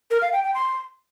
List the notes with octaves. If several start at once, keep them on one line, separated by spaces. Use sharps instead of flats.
A#4
F5
G5
G5
C6